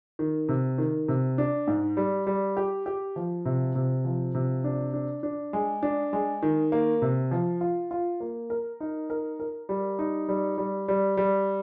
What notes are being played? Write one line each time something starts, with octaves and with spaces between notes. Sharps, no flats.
D#3
C3
D#3
C3
D4
G#2
G3
G3
G4
G4
F3
C3
C3
F3
C3
D4
D4
D4
G#3
D4
G#3
D#3
A#3
C3
F3
F4
F4
A#3
A#4
D#4
A#4
A#4
G3
D#4
G3
G3
G3
G3